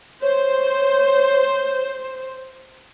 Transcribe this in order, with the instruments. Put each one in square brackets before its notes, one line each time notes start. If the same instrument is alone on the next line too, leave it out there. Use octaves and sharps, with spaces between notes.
[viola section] C5 [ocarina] C#5